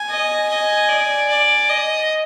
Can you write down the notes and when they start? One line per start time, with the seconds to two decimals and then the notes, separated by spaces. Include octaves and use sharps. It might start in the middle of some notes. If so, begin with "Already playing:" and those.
Already playing: G#5
0.09 D#5
0.49 D#5
0.88 D5
1.29 D5
1.69 D#5